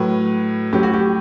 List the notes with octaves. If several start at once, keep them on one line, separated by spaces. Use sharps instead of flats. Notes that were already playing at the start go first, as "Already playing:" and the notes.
Already playing: A2 F#3 B4
A2 F#3 G4
F#4
G4